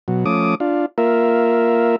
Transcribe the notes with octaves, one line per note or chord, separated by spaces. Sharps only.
B2 F#3
F3 A3 C#4 D6 D#6
D4 F4
A#3 F4 A#4 E5